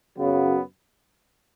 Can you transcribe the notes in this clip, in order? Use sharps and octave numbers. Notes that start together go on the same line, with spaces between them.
F#2 C#3 F#3 B3